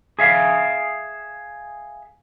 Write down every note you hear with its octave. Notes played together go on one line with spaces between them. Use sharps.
G#4 E5 F5